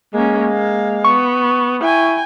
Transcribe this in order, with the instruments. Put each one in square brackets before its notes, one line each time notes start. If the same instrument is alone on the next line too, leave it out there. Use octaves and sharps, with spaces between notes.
[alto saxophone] G#3 [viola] A#3 C#4
[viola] A#3 F5
[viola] B3 [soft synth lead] C#6
[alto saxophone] E4 [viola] G5 G#5